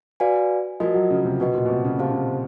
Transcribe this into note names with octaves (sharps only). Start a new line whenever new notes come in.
F#4 B4 D5 F5 G#5
F3 F#4 A#4 D#5
F#3
C#3
C3
B2 F#4 B4 D#5
A#2
B2
C3
C#3
C3 G4 C5 F5 A5
C#3